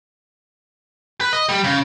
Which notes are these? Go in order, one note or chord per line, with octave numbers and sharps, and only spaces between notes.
B4
D#5
G3
C#3